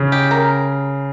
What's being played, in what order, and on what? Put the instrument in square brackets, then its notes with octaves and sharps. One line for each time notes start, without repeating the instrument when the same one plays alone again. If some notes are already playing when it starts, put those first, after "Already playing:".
Already playing: [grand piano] C#3
[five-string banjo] G4
A#4